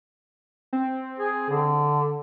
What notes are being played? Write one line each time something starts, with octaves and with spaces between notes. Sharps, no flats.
C4
G#4
D3